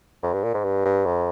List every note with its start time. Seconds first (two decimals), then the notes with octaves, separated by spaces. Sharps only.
0.23 F2
0.33 G2
0.43 A#2
0.54 G#2
0.64 G2
0.86 G2
1.06 F2